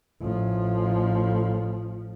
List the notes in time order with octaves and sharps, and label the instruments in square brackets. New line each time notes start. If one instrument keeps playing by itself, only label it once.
[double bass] A1 F3